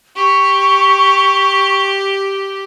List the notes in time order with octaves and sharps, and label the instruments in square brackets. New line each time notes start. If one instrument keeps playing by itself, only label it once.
[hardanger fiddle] G4 [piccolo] C#6